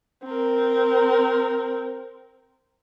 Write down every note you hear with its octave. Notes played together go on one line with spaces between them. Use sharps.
C4 A#4